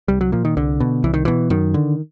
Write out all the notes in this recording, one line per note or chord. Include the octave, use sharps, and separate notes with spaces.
C2 G3
F#3
A#2 F3
D#3
C2 D3
B2
C2 E3
D#3
B2 E3
F#2 D#3
D3